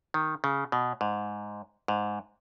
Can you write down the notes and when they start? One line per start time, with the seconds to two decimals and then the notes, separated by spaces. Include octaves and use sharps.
0.14 D#3
0.44 C#3
0.72 B2
1.01 G#2
1.88 G#2